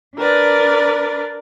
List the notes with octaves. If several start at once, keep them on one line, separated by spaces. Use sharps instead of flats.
D4 A#4 B4 D5